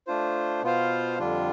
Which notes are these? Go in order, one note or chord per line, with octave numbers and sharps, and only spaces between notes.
A3 D4 F4 C5
B2 B3 F4 C5 F5
F2 D3 G3 D4 F4